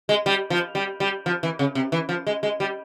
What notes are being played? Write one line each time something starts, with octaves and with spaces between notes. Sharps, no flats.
G#3
G3
F3
G3
G3
F3
E3
C#3
C3
E3
F3
G#3
G#3
G3